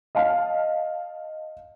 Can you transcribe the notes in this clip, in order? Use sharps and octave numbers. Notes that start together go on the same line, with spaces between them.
D#5 F5 A5 F6